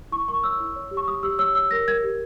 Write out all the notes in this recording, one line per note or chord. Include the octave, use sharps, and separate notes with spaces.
E4 C#6
A#4 C#6
C#5 E6
E4
C#5
G4
C#6
G4 D#6
G4 E6
C#5 E6
C#5 E6
A#4 A#6
A#4 G#6
G4